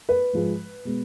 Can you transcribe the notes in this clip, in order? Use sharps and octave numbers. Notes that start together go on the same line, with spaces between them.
B4
G#2 F3 G#3
B2 G#3